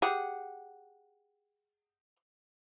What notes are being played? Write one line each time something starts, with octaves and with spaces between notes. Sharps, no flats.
G4 G#4 F#5